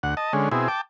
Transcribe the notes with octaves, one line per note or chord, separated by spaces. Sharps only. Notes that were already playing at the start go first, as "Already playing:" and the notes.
D2 F#5
D#5 A5
D3 G#3 C#4
B2 C4 E4 G#4
G5 A5 D6